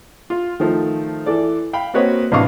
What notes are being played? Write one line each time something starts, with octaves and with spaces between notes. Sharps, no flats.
F4
D#3 F3 A3
E3 A4 D5
F5 G5 B5
A#3 C4 F#4 B4 C#5 D#5
A1 C3 D4 D#5 F5 C#6